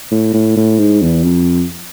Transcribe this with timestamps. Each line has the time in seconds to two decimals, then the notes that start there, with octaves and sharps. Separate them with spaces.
0.11 A2
0.34 A2
0.57 A2
0.79 G#2
1.02 E2
1.24 F2